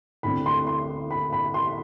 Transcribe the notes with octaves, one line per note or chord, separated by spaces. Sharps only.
D2 D3 A3 C4 E4 B5
C6
C6
B5
B5
C6